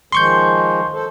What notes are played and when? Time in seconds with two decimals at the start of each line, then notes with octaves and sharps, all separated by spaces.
0.12 D#3 F3 G#3 C6 C#6 G6
0.92 A4 C5